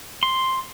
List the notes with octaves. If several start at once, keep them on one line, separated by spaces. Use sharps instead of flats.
C6